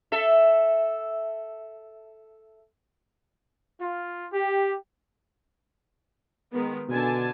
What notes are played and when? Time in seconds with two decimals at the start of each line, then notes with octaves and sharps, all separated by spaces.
0.12 A4 E5
3.80 F4
4.32 G4
6.52 D#3 G#3 B3
6.89 B2 D3 G#5 A5